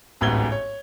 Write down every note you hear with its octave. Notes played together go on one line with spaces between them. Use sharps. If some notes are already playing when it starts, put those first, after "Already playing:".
D1 A1 G#2 B3 G#6 G7
C#5